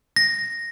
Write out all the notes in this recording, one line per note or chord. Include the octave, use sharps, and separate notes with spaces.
A#6